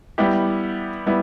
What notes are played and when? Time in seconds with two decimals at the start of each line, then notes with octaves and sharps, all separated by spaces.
0.18 G3 B3 E4 G4
1.06 G3 B3 E4